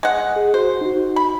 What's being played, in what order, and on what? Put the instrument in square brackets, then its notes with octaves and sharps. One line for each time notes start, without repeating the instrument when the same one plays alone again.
[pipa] G#3 F#5
[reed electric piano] G#4
[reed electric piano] F#4 [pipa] C5
[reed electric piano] D#4 F#4
[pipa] B5